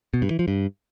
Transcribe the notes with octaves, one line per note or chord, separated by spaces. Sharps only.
B2
G2
E3
F3
G2